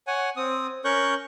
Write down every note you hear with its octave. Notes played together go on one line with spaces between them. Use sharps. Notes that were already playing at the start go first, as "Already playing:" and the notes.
C#5 F#5 G#5
C4 D#6
C#4 A#4 C#5 C#6 F#6 G6